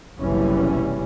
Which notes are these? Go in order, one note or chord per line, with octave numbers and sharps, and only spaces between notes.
F#1 B1 C3 E3 G3 C#4